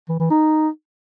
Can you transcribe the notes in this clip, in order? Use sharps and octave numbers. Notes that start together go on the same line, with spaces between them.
E3
E3
D#4